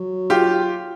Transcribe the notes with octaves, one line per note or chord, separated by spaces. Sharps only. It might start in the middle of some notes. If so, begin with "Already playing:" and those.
Already playing: F#3
F4 G4